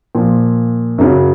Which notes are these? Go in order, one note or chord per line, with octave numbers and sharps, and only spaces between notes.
A#2 F3
F#2 C#3 F#3